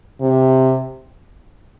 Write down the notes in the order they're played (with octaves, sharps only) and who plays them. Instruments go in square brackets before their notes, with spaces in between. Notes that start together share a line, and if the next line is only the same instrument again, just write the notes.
[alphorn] C3